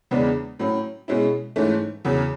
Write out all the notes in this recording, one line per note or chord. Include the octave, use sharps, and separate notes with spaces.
E2 C#3 G#3 B3 D4
A2 F#3 C#4
B2 G#3 C#4 E4
G#2 E3 A3 C#4
E2 C#3 F#3